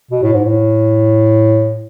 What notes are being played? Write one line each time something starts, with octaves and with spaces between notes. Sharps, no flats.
B2
A2
G#2
A2